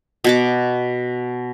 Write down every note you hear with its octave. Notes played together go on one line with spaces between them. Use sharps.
B2 F#4 D6